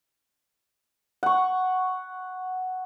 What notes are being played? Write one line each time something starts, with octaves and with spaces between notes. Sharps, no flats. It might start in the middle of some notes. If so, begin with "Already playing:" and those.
F#5 C#6